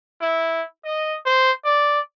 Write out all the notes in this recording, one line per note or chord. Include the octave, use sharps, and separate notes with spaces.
E4
D#5
C5
D5